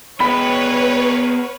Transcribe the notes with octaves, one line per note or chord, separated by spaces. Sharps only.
B3 G#4 B4 C#5 G5 B5